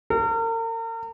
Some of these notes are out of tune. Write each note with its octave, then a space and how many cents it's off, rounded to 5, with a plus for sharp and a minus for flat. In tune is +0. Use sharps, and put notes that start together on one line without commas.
A#4 -40